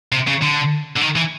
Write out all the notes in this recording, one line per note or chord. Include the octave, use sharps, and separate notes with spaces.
C3
C#3
D3
D3
D#3
E3